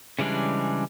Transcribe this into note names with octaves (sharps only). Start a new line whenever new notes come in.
C#3 E3 G3 G#3 D4